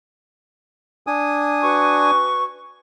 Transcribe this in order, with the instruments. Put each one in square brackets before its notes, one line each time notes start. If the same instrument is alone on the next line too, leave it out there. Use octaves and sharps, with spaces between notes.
[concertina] D4 G#5 D#6
[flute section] F#4 B4 C#6